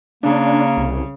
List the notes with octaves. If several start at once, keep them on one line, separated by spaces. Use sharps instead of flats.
C#3 A#3 D4
C2